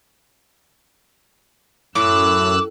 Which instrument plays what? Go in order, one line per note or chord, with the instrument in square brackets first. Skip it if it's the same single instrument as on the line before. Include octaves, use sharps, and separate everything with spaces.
[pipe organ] F#2 E6 F#6 [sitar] A2 [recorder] D6